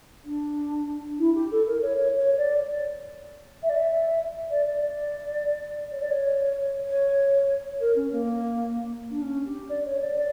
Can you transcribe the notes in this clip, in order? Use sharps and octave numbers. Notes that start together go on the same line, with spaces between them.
D4
E4
G4
A4
A#4
C#5
C#5
C#5
D5
E5
D5
E5
D5
D5
D5
C#5
D5
C#5
C#5
A#4
C#4
A#3
D4
C#4
G4
D5
C#5
D5
D5